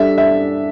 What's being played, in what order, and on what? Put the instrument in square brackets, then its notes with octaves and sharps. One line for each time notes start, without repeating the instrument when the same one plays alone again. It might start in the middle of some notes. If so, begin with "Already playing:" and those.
Already playing: [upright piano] G3 D4 A4 [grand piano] E5
[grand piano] E5